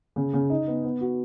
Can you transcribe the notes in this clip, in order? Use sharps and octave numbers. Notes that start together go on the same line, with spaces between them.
C#3
C#3
D#4
B3
B3
F#4